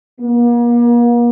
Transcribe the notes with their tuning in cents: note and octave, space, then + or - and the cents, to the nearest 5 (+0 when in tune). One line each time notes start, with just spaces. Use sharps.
A#3 +40